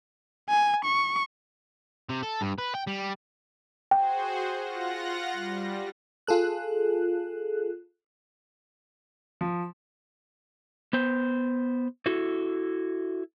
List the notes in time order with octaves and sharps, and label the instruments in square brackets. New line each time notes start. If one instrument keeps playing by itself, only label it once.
[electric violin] G#5
C#6
[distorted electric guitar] C3
A4
G2
B4
G5
G3
[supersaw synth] F#4 G#4 C5 [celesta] G5
[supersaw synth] F4 F#5 A#6
G3
[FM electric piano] F4 G#4 A4 F#6
[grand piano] F3
[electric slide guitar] B3 C5
E4 F#4 A4